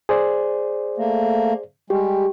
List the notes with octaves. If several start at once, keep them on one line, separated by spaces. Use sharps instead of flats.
G#4 C5 D5
A3 A#3
G3 G#3 G4